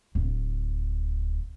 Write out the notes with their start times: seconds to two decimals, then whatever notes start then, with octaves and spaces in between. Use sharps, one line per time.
0.15 D1